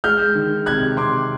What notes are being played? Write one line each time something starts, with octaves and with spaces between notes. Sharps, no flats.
G#3 F6 G6
D#3
C3 F#6 G#6
C3 C6 D6